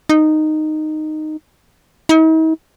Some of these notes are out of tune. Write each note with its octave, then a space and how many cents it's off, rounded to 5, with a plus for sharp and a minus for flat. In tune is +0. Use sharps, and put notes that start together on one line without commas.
D#4 -10
D#4 +45